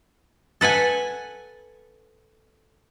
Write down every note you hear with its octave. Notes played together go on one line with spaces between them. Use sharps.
A4 B4 F#5 G#5